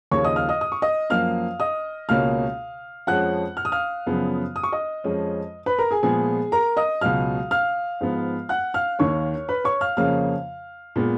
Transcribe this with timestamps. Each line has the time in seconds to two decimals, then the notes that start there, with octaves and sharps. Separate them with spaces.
0.11 D#2 C#3 F3 A#3 C#5 C#6
0.24 D#5 D#6
0.36 F5 F6
0.49 D#5 D#6
0.61 D#6
0.72 C#6
0.82 D#5 D#6
1.10 F#2 F3 A#3 F5 F6
1.60 D#5 D#6
2.09 C#2 B2 A#3 C#4 F5 F6
3.07 F2 F3 G#3 C#4 F#5 F#6
3.57 F6
3.65 D#6
3.72 F5 F6
4.07 F#2 C#3 F3 B3
4.56 D#6
4.64 C#6
4.72 D#5 D#6
5.04 F2 F3 G#3 C#4
5.66 B4 B5
5.79 A#4 A#5
5.91 G#4 G#5
6.03 A#2 F3 G#3 B3 G#4 G#5
6.52 A#4 A#5
6.77 D#5 D#6
7.01 C#2 B2 F#3 F5 F6
7.51 F5 F6
8.01 G#2 F3 B3
8.49 F#5 F#6
8.74 F5 F6
8.99 D#2 D#3 A#3 C#5 C#6
9.49 B4 B5
9.64 C#5 C#6
9.81 F5 F6
9.97 F2 C#3 F3 A#3 C#4 F5 F6
10.96 A#2 G#3 B3